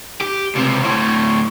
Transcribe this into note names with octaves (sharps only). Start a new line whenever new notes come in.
G4
C#2 C3
D2 A2